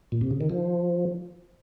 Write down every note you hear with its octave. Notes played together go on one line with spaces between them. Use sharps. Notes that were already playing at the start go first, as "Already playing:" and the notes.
A#2
C3
C#3
D#3
F3